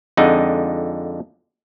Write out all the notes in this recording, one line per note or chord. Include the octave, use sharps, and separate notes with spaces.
F2 D3 G#3 D#4 F#5